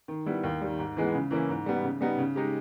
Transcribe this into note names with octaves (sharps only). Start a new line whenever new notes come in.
D#3
G3 B3 E4
D#2
D#3 G3
G#2
E3 G#3 B3
C#3
E3 A#3 C#4 E4
G#2
G3 B3
C#3
G3 B3 D#4
C#3
G#3 D#4 G4